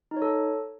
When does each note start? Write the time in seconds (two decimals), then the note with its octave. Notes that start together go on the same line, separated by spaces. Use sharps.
0.11 D#4
0.17 C#5
0.22 A4